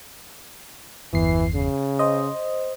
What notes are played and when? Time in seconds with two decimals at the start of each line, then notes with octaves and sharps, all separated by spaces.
1.13 G1 E2 E3 C7
1.54 C#3
1.99 C5 D#5